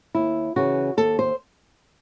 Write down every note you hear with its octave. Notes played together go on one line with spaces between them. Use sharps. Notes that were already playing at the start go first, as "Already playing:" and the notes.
D#2 E4
C#3 E3 F#4
D#2 A4
C5